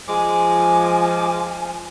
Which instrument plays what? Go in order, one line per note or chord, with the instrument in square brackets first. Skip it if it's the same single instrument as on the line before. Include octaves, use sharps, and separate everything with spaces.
[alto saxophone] F3 [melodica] G#3 D6 [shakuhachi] G#5